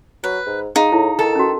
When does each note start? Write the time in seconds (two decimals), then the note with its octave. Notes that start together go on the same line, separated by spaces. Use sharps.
0.24 F#3 B4
0.46 G#2
0.76 G#3 D#4 G#4 F5
0.92 A2 E4
1.19 D#3 A4
1.35 C#4 F#4